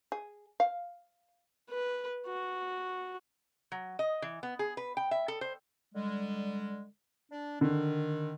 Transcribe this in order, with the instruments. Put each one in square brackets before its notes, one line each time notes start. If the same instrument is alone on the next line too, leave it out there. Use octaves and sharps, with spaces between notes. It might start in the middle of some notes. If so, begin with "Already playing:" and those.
[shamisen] G#4
F5
[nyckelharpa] B4
F#4
[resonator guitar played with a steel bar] F#3
D#5
E3
B3
G#4
B4
G5
E5
A4
C5
[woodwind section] D3 G3 G#3
D4
[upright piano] D3 [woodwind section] D#3